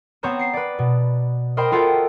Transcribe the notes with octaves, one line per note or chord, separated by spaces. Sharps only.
B3 C4 C#5 A#5 G6 E7
C7 C#7
B4 D5
B2
A#4 C5 D#5 G5 B5
F4 F#4 A4 A#4 G5